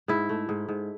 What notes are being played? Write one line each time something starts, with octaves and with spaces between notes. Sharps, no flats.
G#2 E4
A3
G#2
G#2